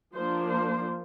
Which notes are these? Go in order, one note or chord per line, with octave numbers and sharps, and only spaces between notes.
F3 A#3 D4 C5
C5